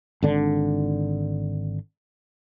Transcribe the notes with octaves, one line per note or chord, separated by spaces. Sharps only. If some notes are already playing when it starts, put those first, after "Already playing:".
G#1 D3 D4